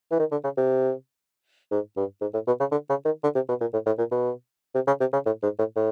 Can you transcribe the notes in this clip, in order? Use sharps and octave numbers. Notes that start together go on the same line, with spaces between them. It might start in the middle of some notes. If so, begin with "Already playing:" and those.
E3
D#3
D3
C#3
C3
G#2
G2
G#2
A2
B2
C#3
D3
C#3
D#3
D3
C3
B2
A#2
A2
A2
A#2
B2
C3
C#3
C3
C#3
A2
G#2
A2
A2